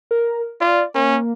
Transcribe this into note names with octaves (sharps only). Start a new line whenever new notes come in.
A#4
F4 D5
A#3 C#4